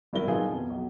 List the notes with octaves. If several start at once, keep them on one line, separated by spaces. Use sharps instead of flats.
G#1 G2 E4 A#4 G7
D#3 F3 F#3 B3 F4 G#4
F2 B2
B1